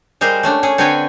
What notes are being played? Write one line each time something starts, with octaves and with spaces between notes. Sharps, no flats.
G3 G#3 A#4 C5
A3 C#4 D4
C#4 G#4
D3 C4 B4 C#5 G5 G#5